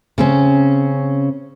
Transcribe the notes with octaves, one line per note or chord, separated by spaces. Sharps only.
C#3 C4 C#4